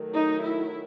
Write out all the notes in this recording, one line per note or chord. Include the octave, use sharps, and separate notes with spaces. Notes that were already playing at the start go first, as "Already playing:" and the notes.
Already playing: D#3 F#3 A3
D#4
E4